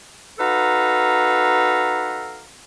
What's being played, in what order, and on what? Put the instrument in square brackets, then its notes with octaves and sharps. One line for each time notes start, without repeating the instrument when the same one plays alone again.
[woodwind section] D#4 F#4 A4 B4 F5 A#5